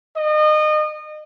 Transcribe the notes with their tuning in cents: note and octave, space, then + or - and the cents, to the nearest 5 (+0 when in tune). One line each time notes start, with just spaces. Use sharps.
D#5 -30